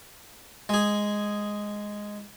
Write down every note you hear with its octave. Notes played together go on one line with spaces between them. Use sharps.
G#3 G#4